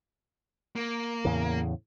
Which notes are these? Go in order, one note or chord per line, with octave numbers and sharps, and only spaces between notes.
A#3
E2 A2 C#3